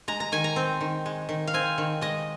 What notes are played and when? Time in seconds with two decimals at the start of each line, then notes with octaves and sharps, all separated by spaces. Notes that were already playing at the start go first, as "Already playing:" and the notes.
0.08 G#3 A#5
0.20 A#5
0.32 D#3 G#5
0.44 A#5
0.56 C4
0.81 D#3
1.06 G#3
1.29 D#3
1.47 F5
1.54 C4 G#5
1.78 D#3
2.01 G#3 D#5